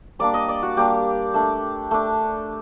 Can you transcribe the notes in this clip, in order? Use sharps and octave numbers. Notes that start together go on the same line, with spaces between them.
G3 A#3 D4 D5
D#5
D5
F#4
G3 A#3 D4 G4
A3 D4
A3 D4